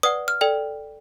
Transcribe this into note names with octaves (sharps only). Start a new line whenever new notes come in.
B4 D5 F#5 D#6
F6
A4 D5 G5